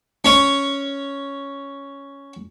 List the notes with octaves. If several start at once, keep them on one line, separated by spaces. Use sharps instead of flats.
C#4 C#5